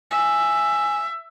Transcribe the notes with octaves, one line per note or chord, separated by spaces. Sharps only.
E5 G#5